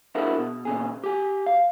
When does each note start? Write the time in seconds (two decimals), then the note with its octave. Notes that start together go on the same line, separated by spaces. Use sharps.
0.15 D4 E4 F#4 G#4 A#4
0.38 B2
0.65 A#2 C#3 G#4
1.04 G4 G#5
1.46 F5